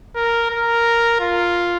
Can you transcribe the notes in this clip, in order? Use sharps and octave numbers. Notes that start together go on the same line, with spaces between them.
A#4
A#4
F4